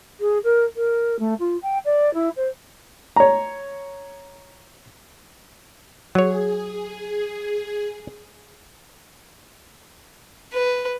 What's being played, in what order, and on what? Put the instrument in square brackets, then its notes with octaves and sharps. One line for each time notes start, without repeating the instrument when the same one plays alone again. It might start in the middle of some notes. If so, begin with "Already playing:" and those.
[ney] G#4
A#4
A#4
A3
F4
G5
D5
E4
C5
[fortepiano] C#5 A#5
[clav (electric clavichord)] F#3 C#5 [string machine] G#4
[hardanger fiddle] B4